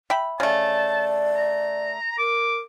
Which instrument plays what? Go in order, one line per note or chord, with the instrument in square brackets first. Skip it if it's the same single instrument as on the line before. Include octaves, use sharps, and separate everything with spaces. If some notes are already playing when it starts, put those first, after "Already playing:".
[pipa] E5 G5 B5
[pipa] C#3 A3 [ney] D5 [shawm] A5
[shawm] A#5
[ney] A#4 [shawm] D6